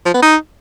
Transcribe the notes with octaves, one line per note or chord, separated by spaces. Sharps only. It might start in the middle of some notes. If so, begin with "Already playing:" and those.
F3
B3
D#4